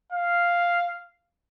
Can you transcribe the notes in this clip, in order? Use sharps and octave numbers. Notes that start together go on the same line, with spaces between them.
F5